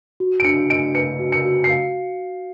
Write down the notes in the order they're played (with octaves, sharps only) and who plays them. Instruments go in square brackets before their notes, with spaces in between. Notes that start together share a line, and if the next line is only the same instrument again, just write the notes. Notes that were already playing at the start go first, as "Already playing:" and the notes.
[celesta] F#4
[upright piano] D7
[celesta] D4 [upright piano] C#7
[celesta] D#5 [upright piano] D7
[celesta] B4 [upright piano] C#7
[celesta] F#4
[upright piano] C#7
[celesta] F#4
[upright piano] C7
[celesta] F5